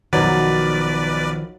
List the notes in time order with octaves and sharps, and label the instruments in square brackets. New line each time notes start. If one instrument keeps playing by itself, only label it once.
[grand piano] B1 B2 [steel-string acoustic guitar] D#3 F3 [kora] F#3 [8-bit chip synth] B4 D5